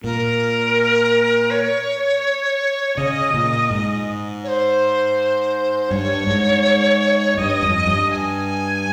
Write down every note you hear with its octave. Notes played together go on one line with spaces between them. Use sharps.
A#2 A#4
C#5
C#3 D#5
A#2
G#2
C#5
C5
G2 C#5
G#2
G2 D#5
F2
G2
G#5